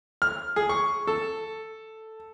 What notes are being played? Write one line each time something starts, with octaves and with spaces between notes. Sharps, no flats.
F6
G#4
C#6
A4